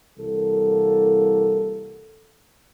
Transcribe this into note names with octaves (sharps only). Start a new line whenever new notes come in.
C2 E3 A#3 F#4 A4